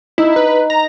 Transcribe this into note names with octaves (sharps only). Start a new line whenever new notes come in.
D#4 E4
B4
A#5